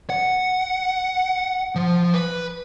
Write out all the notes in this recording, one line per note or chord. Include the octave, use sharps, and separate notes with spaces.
F#5
F3
B4